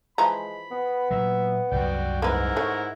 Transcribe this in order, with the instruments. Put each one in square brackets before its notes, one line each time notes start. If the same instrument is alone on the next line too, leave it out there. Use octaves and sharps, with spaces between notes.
[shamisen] E3 F3 A#5 [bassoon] G#3 [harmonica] B5
[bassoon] B3
[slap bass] A#2 F#3 [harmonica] E5
[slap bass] C2 F#2 [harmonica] F#4 D5 G5
[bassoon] G#2 [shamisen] A#3 B4 [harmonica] E4 A#4 F#5
[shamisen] A3 C#5